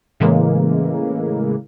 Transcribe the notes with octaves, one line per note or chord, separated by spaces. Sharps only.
A2 C#3 E3 G#3 A#3